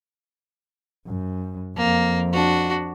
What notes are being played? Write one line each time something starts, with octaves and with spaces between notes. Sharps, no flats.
F#2
F2 A#3
D4 F#4